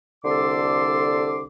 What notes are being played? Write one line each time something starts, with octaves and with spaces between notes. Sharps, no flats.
C2 D3 A4 C6 D6